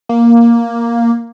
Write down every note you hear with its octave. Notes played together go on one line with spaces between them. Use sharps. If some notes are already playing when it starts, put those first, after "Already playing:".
A#3